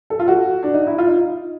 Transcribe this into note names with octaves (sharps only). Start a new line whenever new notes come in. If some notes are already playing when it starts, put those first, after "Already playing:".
A4
F4
F#4
D4
D#4
E4
F4
D#4